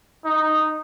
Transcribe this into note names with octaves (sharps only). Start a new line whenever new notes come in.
D#4